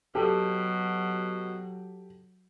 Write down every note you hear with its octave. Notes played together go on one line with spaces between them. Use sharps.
B2 F#3 G4 A4